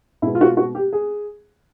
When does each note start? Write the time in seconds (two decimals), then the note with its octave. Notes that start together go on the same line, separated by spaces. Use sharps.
0.22 B2 G#3 B3 E4
0.35 F4
0.41 F#4
0.45 F4
0.57 F#4
0.75 G4
0.93 G#4